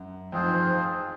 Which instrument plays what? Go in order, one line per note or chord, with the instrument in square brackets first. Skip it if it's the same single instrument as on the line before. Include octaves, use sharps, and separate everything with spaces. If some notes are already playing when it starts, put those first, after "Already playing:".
Already playing: [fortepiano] F#2
[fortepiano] F2 [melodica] C4 F4 G#4 C5
[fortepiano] G#2
F3